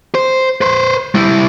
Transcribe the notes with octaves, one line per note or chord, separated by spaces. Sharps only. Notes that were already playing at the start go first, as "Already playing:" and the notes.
C5
B4 C5
G3 E4